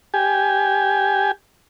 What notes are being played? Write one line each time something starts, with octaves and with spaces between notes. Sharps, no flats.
G4 G#5